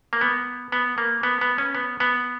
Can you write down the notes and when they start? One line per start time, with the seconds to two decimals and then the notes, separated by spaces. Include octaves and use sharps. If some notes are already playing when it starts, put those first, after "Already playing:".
0.13 A#3
0.21 B3
0.72 B3
0.98 A#3
1.23 B3
1.41 B3
1.58 C#4
1.75 B3
2.00 B3